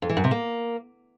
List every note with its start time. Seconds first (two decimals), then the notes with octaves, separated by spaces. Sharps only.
0.02 F2
0.09 E3
0.17 F#2
0.24 C3
0.31 A#3